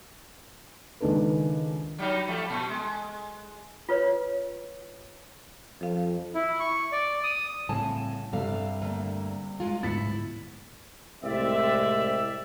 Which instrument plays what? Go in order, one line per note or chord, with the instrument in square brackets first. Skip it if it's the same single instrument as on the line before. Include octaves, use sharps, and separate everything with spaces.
[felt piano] C#2 D#3 D4 A4 B4
[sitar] F#3 G3 D#4
F3 G3 A3
A#2
G#3
[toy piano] F4 B4 C#5
[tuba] F2 [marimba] F3 F5
[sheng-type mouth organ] E4
C#6
D5
D#6
[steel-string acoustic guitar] A2 C#3 A5 [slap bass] G3 C4 [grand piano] G#5
[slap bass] G2 [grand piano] C3 G3 [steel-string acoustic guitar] A4 F5
[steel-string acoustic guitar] D3 A3 A#3
G#3 F4
[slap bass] D1 G#2 B3 [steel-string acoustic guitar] E4 [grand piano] A6 B6 C#7
[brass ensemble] C2 A2 G#3 C4 D5 E5